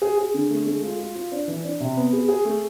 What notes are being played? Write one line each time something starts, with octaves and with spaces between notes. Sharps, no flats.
G#4
G#4
D3
A3
G#3
F4
F4
F4
D4
E3
D4
C3
B3
G#4
G#4
A3